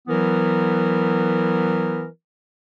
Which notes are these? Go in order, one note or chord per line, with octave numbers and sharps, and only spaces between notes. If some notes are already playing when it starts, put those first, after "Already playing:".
E3 F#3 B3 E4 A#4